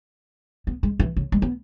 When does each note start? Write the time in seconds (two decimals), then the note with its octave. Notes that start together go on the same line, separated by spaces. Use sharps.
0.67 B3
0.83 G#3
1.00 E3
1.16 C#3
1.32 G#3
1.42 B3